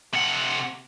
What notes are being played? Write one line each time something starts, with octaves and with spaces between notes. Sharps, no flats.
C3 F#5